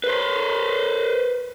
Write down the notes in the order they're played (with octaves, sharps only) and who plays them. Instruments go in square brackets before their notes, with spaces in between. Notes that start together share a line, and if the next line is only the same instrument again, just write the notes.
[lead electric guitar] B4 C5